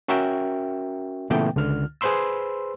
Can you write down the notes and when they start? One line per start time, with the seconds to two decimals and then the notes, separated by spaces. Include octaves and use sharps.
0.08 C#4 F#4 A#4 E5 G5
1.30 A#2 C#3 E3 A3 B3 G5
1.56 C#2 D3 F6
2.01 G#4 B4 C5 B5 C6 E6